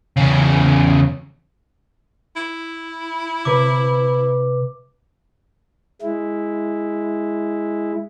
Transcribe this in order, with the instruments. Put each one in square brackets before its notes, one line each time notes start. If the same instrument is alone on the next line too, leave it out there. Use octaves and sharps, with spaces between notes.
[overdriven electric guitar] E2 C#3
[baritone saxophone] E4
[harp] C3 B4 [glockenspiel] D6
[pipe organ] G#3 E4